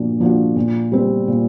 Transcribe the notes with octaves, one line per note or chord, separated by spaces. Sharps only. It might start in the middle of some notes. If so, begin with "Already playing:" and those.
Already playing: A#2 F3 A#3 D4 F#4
F3 A#3 D4 F#4
A#2
G3 C4
A#2